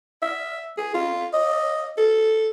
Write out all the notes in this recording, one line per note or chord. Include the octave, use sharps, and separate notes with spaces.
E5
G#4
F4
D#5
A4